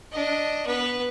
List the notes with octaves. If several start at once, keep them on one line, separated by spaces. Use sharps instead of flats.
D4 D#5
B3 B4